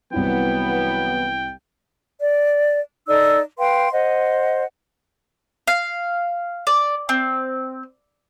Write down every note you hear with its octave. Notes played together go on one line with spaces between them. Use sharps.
C2 E3 F#3 B3 C4 E4 G5
D5
D#4 A4 D5 E6
B4 F5 G5 C6
C5 D#5 F#5
F5
D5
C4